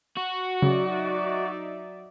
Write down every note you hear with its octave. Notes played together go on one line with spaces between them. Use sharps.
F#4
C#3 F#3 D#4 D5 E5